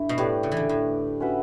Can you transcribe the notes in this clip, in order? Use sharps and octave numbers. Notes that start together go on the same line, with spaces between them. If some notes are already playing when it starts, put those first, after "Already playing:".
Already playing: G2 A3 E4
B2
A2 D4 G4 B4 D5
C#3
E3
D3
A2
C#4 F#4 B4 E5